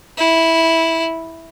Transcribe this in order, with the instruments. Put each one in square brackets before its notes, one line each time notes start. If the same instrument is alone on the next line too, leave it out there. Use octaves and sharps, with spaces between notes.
[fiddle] E4